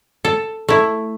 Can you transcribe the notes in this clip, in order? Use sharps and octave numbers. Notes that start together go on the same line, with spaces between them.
A4
A3 E4